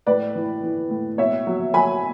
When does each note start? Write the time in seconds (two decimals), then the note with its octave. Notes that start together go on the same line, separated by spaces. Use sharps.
0.07 A2 B4 D5
0.35 E3
0.63 E3
0.91 A2
1.18 B2 C#5 E5
1.47 F#3
1.74 F#3 G#5 B5